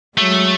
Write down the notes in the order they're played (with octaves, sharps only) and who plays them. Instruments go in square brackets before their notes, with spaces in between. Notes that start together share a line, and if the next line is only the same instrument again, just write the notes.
[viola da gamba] F#3 G#3 [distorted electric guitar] A3